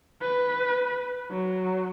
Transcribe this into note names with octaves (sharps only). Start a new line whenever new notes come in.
B4
F#3